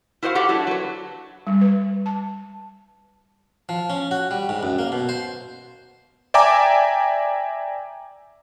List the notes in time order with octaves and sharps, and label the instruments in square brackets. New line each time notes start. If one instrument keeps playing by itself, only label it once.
[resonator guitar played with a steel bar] E4 F#4 C5 D5 F5
G4 A4 F#5
F#3 A3 D4 E4
F#3 B4
[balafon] G3
B4
A5
[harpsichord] F3
C#4
F#4
G3
G#2
F#2
A#3
B2
C5
[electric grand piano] D5 E5 G5 G#5 A#5 D6